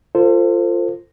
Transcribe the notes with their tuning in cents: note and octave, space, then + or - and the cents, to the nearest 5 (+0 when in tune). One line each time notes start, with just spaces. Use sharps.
F4 -10 A4 +35 C5 +0